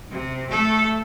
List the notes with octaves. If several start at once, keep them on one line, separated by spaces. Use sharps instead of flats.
C3
A3 A4